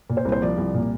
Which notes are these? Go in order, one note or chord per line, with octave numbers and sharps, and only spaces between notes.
A#2
C5
C2
C5
F3 D5
C2
A#2